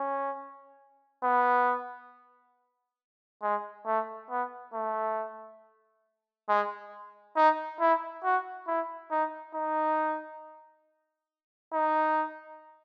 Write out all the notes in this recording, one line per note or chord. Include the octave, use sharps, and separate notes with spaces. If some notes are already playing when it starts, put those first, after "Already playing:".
Already playing: C#4
B3
G#3
A3
B3
A3
G#3
D#4
E4
F#4
E4
D#4
D#4
D#4